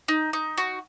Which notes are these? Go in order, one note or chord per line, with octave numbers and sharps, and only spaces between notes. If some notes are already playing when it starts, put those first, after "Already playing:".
D#4
D#4
F#4